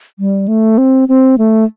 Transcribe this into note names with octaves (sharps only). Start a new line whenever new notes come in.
G3
A3
C4
C4
A3